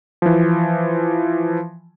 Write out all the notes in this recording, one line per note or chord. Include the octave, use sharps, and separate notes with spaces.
E3 F3